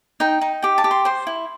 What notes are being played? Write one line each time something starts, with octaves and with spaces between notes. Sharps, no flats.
D#4 G5
D#4
G4 G5
A5
G4
C6
C5 C6
E4